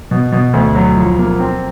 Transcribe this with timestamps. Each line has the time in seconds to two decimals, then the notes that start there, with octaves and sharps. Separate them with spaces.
0.11 B2
0.32 B2
0.54 D2
0.75 F#3
0.97 F3
1.19 A#3
1.40 C4